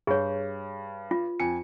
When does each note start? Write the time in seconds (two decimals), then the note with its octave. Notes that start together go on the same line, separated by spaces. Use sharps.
0.07 G2 G#4 C#5
1.11 F4
1.40 F2 G#5 C#7